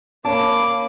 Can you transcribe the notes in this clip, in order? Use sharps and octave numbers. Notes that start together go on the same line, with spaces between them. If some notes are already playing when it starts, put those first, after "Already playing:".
A#3 C#4 A5 B5 D6